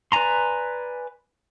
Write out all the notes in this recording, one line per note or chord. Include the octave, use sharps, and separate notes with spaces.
B4 D5 G#5 A#5 C6